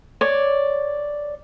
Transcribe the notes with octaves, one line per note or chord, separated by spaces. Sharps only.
C#5 D5